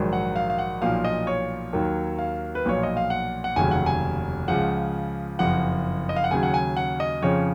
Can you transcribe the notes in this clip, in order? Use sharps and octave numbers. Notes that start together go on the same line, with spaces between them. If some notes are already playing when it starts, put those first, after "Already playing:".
Already playing: A#1 G#2 D#3 F#3
F#5
F5
F5
F#5
B1 A#2 F3 F5
D#5
C#5
D#2 D#3 F#3
F5
B4
B1 A#2 F3 C#5
D#5
F5
F#5
F#5
F1 D#2 C#3 F#3 G#5
F#5
G#5
C#2 C#3 F3 F#5
F#1 F2 F3 F#5
D#5
F5
F#5
D#2 C#3 F#3 G#5
F#5
G#5
F#5
D#5
F2 C#3 F3 C#5